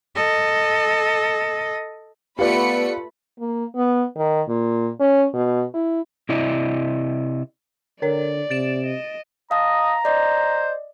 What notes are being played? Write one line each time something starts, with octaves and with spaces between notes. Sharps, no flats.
A4 D#5
A3 B3 F4 G4 B4 D5 B5 C#7
A#3
B3
D#3
A#2
C#4
B2
E4
C3 E4 D5 D#5
D3 A#4 C#5 D5
C3 A6 D7 E7
D#5
D#5 F5 A5 A#5
C5 D5 D#5